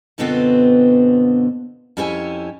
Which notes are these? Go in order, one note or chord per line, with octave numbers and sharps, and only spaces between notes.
F#2 B2 D3 B3 C4 F4
F2 C#4 E4 G4 C#5 G#5